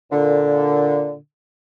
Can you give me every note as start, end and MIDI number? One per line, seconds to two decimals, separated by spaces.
0.12 1.15 46
0.12 1.15 50